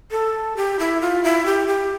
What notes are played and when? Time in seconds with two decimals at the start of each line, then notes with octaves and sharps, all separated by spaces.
0.11 A4
0.56 G4
0.79 E4
1.01 F4
1.24 E4
1.46 G4
1.68 G4